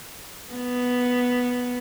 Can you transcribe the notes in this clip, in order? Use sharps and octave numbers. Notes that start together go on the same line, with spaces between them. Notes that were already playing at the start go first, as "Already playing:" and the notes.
B3